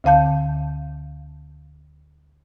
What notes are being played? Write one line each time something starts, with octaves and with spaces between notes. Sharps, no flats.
D2 D3 F5 A5 G6